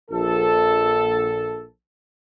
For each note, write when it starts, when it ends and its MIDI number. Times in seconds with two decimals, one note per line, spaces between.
0.11 1.64 34
0.11 1.64 69